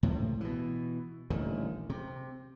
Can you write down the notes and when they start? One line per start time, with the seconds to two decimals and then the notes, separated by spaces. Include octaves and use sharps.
0.03 C#2 A2 C3
0.41 B2 E3
1.30 D#1 A1 D3 D#3
1.90 C3